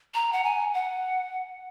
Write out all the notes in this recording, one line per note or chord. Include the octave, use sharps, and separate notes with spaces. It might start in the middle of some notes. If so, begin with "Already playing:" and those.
A#5
F#5
G#5
F#5